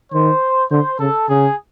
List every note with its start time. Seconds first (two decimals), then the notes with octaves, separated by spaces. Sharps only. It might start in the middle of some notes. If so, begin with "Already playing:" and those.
0.13 D#3 C5
0.71 D3 C5
0.99 C#3 A4
1.29 C#3 G#4